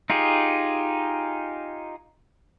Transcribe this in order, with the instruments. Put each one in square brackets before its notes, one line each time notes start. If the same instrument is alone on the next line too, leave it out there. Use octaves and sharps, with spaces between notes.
[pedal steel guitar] D#4 F4 G4 G#4